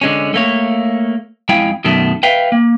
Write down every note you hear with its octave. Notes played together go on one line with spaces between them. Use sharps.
D3 G#3 C#4
A3 A#3 C#5
F2 G#3 E4 F5 G5 G#5
F#2 B2 D#3 F#3 A3 A4
B4 E5 F5 G5
A#3